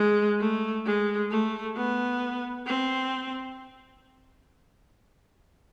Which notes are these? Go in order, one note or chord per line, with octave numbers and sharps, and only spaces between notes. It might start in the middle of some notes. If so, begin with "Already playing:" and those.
Already playing: G#3
A3
G#3
A3
B3
C4